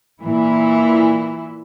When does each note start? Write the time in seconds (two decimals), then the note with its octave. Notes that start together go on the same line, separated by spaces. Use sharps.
0.22 A#2 E3 E4